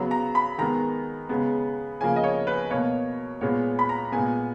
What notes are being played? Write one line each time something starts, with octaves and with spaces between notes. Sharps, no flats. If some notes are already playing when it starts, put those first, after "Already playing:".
Already playing: C#3 F#3 B3 A#5
A#5
B5
D#3 G#3 B3 A#5
C#3 G#3 B3
C#3 F3 A#3 G#5
D#5
C#5
B4
B2 A#3 C#5
A#2 G#3 B3 C#5
B5
A#5
A#2 G#3 B3 G#5